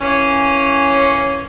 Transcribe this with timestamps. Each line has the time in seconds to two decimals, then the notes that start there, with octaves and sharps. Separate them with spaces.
0.01 E3 A#3 C#4